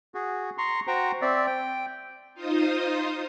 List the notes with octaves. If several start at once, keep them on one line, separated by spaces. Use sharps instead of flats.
F#4 G#4
A#5 C6 C#6
F#4 C5 G5 A#5 C#6
C4 D5 E5
G5
D#4 F4 C5 D#6